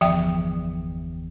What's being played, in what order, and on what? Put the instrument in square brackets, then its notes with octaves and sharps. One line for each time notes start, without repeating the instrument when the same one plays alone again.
[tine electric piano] G1 E2 [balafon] F3 E5 G5